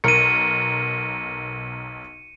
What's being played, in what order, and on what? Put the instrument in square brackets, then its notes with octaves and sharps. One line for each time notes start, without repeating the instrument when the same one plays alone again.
[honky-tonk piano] B1 A#4 [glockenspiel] C#7 D#7